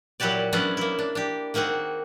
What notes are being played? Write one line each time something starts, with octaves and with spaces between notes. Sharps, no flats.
A#2 F#3 E4 F#4 G4 D5
F#3 B3 C#4 D4 E4 G#4
A#3 E4
D4
D4 G4
D#3 A#3 C4 F#4 G#4